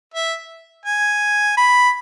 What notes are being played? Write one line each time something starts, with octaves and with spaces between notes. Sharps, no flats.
E5
G#5
B5